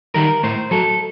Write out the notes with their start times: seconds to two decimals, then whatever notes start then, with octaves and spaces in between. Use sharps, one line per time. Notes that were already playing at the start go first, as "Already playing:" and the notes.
0.14 D#3 G3 A#4
0.43 A2 C5
0.71 F#3 A4